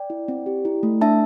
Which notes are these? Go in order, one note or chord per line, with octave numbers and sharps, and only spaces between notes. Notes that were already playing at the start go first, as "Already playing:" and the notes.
Already playing: D5 G5
E4
C4
G4
E4
A3
D4 E5 A5